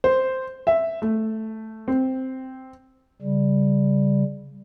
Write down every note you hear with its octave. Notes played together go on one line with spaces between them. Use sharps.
C5
E5
A3
C4
C#3 G3